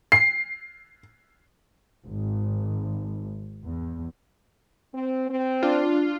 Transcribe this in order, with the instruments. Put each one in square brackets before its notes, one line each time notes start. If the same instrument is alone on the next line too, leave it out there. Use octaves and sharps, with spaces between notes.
[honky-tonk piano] C7
[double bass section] G#1
E2
[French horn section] C4
C4
[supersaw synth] D4 [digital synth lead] F4